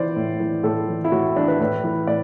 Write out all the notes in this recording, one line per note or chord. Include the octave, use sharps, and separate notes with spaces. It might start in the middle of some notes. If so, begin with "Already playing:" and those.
Already playing: E3 C5 D5
A2
E3
A2 A4
E3
E4
A2 F#4
E3 D4
B4
A2
E3
A2 D5